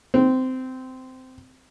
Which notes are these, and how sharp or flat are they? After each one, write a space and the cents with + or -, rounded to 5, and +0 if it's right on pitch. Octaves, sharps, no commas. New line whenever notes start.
C4 -15